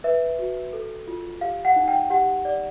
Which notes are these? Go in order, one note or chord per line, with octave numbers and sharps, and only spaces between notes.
B4 E5
F#4
A4
F4
G4 F5
F#5
D#4
G5
G4 F#5
D5